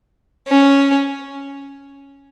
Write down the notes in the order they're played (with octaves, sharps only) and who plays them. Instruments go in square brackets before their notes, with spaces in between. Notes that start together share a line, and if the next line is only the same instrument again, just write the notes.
[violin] C#4